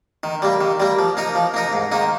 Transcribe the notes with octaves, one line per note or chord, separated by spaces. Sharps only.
D#3
G3 A#3
D#3
G3 A#3
F3
A#3 D#4 A#4
F3
A#3 D#4 A#4
G#2
D#3 A#3 D#4